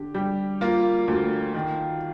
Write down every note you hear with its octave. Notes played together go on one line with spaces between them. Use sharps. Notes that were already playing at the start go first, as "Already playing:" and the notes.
Already playing: D3 G4
G3 G4
A#3 F4
D2
D#3